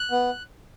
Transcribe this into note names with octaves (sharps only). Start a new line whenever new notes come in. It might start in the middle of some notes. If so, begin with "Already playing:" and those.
Already playing: F#6
B3